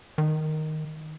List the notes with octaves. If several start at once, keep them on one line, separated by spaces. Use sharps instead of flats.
D#3